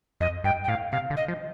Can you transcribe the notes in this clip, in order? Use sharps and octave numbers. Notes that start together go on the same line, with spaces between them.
F2 D#5
G2 G5
G5
A2 F5
C3 F5
D3
D#5
F3